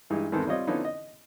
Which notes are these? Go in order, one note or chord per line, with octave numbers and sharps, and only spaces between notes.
G2 E3 G#3 D#4
E2 G#2 D#3 B3 C4 A4
G3 C4 F4 C#5 D#5
D3 F3 B3 C#4 D#4 E4
D#5